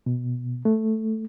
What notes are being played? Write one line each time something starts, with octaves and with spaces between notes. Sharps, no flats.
B2
A3